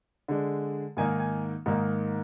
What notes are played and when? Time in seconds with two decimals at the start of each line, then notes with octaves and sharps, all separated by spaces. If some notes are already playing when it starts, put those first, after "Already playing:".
0.28 D3 G#3 D4
0.97 G#2 D#3 A#3 D#4 G#5
1.20 G#5
1.66 G#2 D#3 A#3 D#4